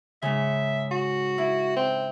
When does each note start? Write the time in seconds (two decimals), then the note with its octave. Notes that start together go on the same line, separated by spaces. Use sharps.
0.22 G#2 C#3 E5
0.91 F#4
1.38 E4
1.76 C4